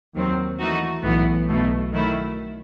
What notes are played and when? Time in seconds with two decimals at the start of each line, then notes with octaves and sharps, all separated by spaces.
0.15 D#2 D#3 F#3 C4
0.59 E3 A3 D#4 F#4
1.03 B1 A2 E3 B3
1.47 B1 B2 A3
1.92 D#3 F#3 A3 E4